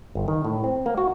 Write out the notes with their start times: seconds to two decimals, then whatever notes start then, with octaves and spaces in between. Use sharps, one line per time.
0.15 G1
0.28 D#3
0.45 A2
0.64 C4
0.86 A#3
0.97 F#4